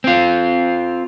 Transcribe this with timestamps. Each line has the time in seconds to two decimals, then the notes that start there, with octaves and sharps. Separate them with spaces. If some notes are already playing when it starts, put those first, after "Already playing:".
0.04 C4 F4